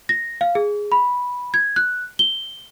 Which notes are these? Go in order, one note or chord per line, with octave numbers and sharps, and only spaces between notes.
A#6
F5
G#4
B5
G#6
F#6
G7